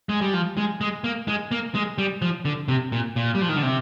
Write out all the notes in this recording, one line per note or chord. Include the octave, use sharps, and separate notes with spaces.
G#3
G3
F3
G#3
G#3
A#3
G#3
A#3
G#3
G3
F3
D3
C3
A#2
A#2
G3
F3
D#3
D3
C3